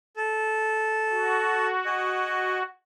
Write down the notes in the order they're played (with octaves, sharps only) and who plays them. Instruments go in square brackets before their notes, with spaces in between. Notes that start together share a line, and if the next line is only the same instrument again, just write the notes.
[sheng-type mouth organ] A4
[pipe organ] F#4
[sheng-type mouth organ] G#4 D#5